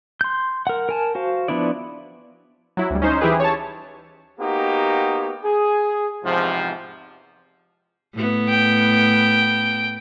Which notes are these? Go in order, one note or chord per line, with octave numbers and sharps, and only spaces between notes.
C6 G6
A#4 F#5
A#4 G#5 A5
F#4 C5 F5
F3 B3 D4 E4 D5
F#3 E4
D2 G3
C#4 D#4 C5
E3 E4 G4 G#4 B4
C#5 A5
A#3 B3 D#4 F#4 G4
G#4
E2 G#2 C3 F3
A2 B3
G5